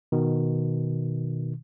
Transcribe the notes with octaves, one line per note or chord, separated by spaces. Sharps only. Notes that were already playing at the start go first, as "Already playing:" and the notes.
B2 D#3